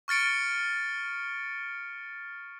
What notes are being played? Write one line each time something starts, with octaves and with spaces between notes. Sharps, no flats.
C#6 F6 A6 C#7 D7